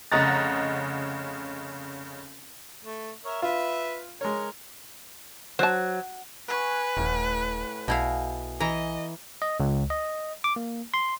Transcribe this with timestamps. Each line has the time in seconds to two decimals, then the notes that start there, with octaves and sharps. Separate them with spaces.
0.12 F1 C#3 D#5 F#5 A#5 A6
2.84 A3
3.25 A#4 C#5 E5
3.42 F4 B4 E5
4.21 G#3 A#4 C#5
5.59 F#3 C5 A5
6.48 B4 F#5 G#5 C#6
6.97 D#1 A2 F#5
7.88 B1 B2 E4 G#4 F5
8.60 E3 D#5 A#5
9.42 D#5
9.60 C#2
9.90 D#5
10.44 D6
10.56 A#3
10.94 C6